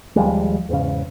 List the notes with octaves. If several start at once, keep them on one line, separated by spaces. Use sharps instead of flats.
D#2 F3 G3 G#3
E2 G#2 C#3